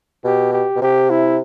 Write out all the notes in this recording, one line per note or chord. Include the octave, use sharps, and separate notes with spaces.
B2 G4
G4
B2
C3 G4
E4